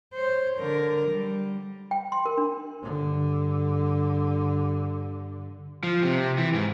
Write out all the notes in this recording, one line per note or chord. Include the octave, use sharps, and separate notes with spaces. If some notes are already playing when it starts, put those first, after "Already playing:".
C5 C#5
D3 A#4
G3
G5
C6
A#4
D4
G2 D3
F3
C3
E3
G#2